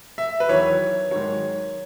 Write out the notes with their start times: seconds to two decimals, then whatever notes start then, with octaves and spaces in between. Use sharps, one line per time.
0.18 E5
0.40 B4
0.49 E2 D#3 F#3 C#5
1.11 G#2 D#3 F#3 C#5